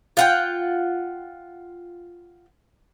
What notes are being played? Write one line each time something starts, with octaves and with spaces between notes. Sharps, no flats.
F4 F#5 G5